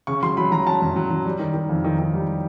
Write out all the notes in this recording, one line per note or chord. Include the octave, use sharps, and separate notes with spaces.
C#3 C#6
F#3 C6
F#3 B5
F#3 A#5
F#3 A5
F#2
F#3
F#3
G3
D#3
D#3
F2
D#3
D#3
G3